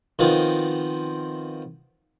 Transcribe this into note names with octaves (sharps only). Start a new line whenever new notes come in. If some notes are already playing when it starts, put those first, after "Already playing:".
D#3 F3 B3 C4